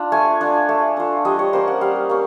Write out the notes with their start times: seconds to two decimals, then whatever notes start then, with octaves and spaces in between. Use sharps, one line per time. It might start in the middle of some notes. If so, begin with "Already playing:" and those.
Already playing: D4 F4
0.12 A3 G#5
0.41 D4 F4
0.69 A3
0.97 D4 F4
1.25 G3 D#5
1.39 C#5
1.53 A#3 C#4 C5
1.68 F#5
1.81 G3 F5
2.09 A#3 C#4